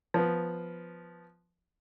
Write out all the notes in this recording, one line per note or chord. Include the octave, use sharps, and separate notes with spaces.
F3 B3